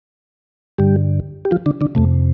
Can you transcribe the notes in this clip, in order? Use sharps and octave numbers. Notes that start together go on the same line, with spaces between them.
G2 D3 G3 G4
G4
F3 F4
D3 D4
D3 D4
F2 C3 A3